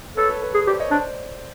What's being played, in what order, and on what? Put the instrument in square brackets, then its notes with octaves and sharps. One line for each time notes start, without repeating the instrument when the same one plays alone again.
[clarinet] A4 [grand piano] B4 C#5
[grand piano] A4 B4
A4 B4
[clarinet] G#4
[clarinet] G4 [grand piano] C5 D5
[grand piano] C#5 D#5
[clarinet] D4 [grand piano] C5 D5